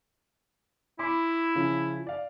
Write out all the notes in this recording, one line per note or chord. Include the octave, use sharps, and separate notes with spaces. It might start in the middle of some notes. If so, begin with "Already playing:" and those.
E4 B5 C6 D6
C#3 F3 C#4
D5 F5